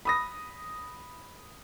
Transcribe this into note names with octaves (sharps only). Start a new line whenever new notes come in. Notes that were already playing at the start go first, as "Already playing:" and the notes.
B5 D#6 A#6